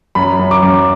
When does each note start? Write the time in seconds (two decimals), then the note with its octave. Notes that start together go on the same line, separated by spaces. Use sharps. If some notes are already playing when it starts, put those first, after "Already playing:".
0.15 F#2 B5
0.39 F#2
0.51 D6
0.63 F#2